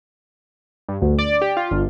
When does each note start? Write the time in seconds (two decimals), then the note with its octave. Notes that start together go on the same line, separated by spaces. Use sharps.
0.89 G2
1.01 D2
1.19 D5
1.41 G4
1.57 F4
1.71 G1